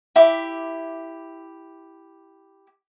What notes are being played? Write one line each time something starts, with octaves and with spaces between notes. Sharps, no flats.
E4 G4 E5 D6